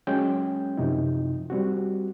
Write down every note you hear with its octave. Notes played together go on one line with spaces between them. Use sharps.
F#3 G#3 C#4 G5
F#2 C3 F3 D#4 E4
G3 C4 F#4